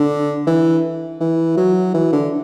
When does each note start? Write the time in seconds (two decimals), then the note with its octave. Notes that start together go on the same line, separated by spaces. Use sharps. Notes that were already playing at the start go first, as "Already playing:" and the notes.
Already playing: D3
0.47 E3
1.20 E3
1.57 F#3
1.94 E3
2.13 D3